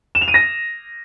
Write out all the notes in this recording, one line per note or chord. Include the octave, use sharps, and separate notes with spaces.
E7
F7
D#7
A#6